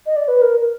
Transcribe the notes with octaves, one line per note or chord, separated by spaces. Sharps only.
D#5
D5
B4
A#4